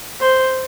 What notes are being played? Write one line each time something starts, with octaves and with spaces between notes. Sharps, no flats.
C5